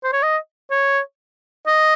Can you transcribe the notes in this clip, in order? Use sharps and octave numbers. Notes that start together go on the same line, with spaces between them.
C5
C#5
D#5
C#5
D#5